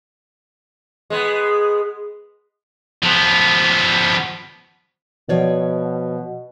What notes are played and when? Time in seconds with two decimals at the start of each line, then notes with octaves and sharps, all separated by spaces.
1.10 G#3 B3
3.03 F3 B3
5.29 B2 F3 C#5 D5